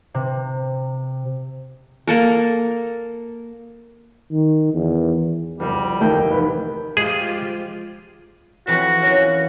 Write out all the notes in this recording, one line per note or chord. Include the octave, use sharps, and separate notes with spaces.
C3
A#3 A4 A#4
D#3
E2
F#1 C2 F2 G3
A1 D#2 A3 G5
F1 B4
F3 G#3 F4 G4 G#4
F2 E3 F#4 E5
E3 A#3 C#4